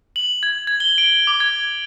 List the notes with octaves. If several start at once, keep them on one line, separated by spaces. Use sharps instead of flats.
F#7
G#6
G#6
G7
D7
D6
G#6